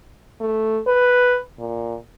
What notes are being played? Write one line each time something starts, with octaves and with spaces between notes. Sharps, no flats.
A3
B4
A#2